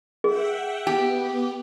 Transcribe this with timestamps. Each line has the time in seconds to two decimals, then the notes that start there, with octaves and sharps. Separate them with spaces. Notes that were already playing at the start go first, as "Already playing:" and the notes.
0.24 G#4 E5 F#5 G5
0.87 B3 G4